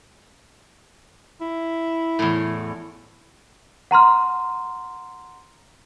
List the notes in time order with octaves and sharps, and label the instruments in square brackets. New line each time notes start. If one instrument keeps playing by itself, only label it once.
[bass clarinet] E4
[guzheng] E2 A2
[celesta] F#5 A#5 C6 F6